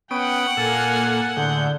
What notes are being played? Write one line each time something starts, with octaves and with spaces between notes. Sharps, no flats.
B3 C#4 F#5 G5 D#6 D7
A#2 A#3 A4 G#5
A2 D3 G#4 G6